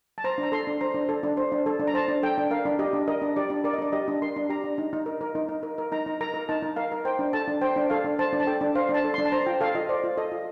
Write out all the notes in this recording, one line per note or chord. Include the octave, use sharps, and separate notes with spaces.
A5
C5 A#5
D4
A#5
A4 C6
D4
C5 A#5
D4
A4
D4
C5
D4
A4
D4
A#5
C5 A5
D4
A4 G5
D4
A#4 F5
D4
G4 D#5
D4
A#4 D#5
D4
G4 D5
D4
A#4 D5
D#5
D4 D5
G4 D#5
D4
A#4 C6
D4
G4 A#5
D4
D#4
D#4
A#4
A#4
D#4
D#4
A#4
A#4
D#4 A#5
D#4
A#4 A#5
A#4
D#4 A5
D#4
A#4 F5
A#4
C5 G5
D4
A4 A5
D4
C5 G5
D4
A4 F5
D4
C5 A5
D4
A5
A4 G5
D4
C5 F5
D4
A5
A4
D4 C6
A5
C5 A#5
F4 G5
A4 F5
F4 D#5
C5 D5
F4
A4 D#5
F4